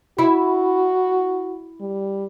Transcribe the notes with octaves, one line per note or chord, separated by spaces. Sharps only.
E4 F#4
G3